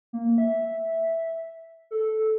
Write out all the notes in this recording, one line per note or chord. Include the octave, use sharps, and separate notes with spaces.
A#3
E5
A4